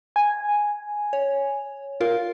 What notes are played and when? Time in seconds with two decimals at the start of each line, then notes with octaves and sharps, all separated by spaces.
0.16 G#5
1.13 C#5
2.00 F4 A#4 F5